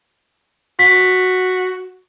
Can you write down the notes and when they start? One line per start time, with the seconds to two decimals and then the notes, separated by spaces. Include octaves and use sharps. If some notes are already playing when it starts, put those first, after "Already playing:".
0.79 F#4 B6